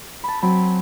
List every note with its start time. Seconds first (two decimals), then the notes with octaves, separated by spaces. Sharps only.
0.24 A5 B5
0.42 F#3 C4 B5